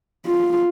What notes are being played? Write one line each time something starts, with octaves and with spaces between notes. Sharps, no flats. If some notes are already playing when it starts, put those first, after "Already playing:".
F4